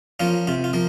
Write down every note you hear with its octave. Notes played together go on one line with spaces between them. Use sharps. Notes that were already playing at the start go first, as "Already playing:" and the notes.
F3 A#3 C#4 F4
C3 F4
F4
F3 A#3